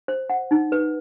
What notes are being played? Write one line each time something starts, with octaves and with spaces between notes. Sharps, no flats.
C5
F#5
D#4
B4